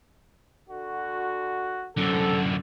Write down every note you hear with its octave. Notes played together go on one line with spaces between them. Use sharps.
D3 F#4
F#2 D3 C4 A4